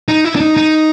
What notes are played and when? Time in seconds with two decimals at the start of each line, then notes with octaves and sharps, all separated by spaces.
0.08 D#4
0.25 E4
0.36 D4
0.41 D#4
0.57 D#4